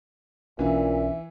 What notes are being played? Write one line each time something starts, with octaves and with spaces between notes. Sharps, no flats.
B1 A#2 E3 C#4 D4 E5